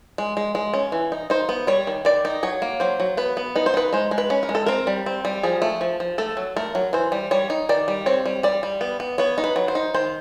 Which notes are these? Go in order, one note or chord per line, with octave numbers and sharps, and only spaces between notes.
G#3
G#3
G#3
C#4
E3
D#4
D#4 C5
B3
G3 C#5
D#3
D#3 D5
D#4
F#3 C#5
A#3
F#3 C5
F#3
B3 B4
B3
D#4 B4
C5
D#4 B4
G#3 C5
G#3
B4
C#4
A#4
G#3
A4
C4 A#4
G3
C4
G3
F3 G#4
A3
F3
F3
A3 A4
F#3
A3 A#4
F#3
E3 C5
G3
G3 C#5
D#4
D#3 D5
G3
C4 C#5
G3
G3 D5
G3
B3
B3
B3 C#5
D#4
B4
F#3
C5
D#4
D#3 C5